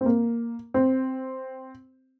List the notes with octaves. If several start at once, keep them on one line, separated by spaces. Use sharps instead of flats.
C4
A#3
C4